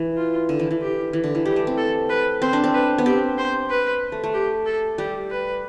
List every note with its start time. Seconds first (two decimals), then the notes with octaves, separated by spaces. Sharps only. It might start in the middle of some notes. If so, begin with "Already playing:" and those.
Already playing: E3
0.17 F4
0.49 D3
0.59 E3
0.71 E3
0.82 G4
1.13 E3
1.24 D3
1.35 E3
1.45 G3 G4
1.56 A3
1.67 C4
1.78 A4
2.09 B4
2.42 C4 C5
2.53 D4
2.64 C4
2.74 B4
2.98 B3
3.06 C4 G4
3.38 C5
3.70 B4
4.12 A3
4.24 A3
4.34 G4
4.66 A4
4.98 G3 G4
5.31 B4